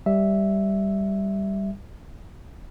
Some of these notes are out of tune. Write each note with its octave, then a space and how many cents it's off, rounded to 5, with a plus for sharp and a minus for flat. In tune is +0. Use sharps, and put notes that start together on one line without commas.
G3 +0 E5 +0